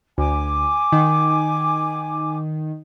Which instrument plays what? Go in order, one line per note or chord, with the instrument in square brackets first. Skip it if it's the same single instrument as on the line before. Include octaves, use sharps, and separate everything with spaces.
[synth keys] D2 [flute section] G#5 D6
[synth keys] D#3